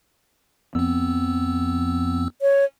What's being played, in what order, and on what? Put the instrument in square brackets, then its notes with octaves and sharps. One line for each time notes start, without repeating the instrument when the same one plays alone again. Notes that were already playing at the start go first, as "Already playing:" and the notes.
[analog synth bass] F2 [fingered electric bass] B3 [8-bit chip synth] C4 E6
[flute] C#5